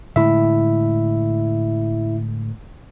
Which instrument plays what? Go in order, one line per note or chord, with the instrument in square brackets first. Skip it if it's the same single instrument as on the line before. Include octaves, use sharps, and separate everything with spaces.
[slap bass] A2 D3 G#3 [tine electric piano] E4 E5